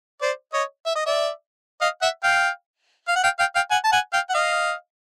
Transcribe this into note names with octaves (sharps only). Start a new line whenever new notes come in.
C5 D5
C#5 D#5
E5
D#5
D5 E5
D#5 F5
E5 F#5
F5 G5
F5
F#5
F5 G5
F5 G5
F5 G5
F#5 G#5
A5
F#5 G#5
F5 G5
F#5
D#5 F5